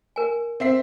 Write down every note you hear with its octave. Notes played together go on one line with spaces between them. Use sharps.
A#4 G#5
C4 E5 C7